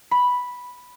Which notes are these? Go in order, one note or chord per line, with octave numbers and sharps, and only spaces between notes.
B5